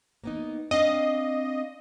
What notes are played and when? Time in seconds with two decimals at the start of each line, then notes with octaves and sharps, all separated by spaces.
0.24 A#3 B3 D#4
0.71 C4 D4 D#5 F5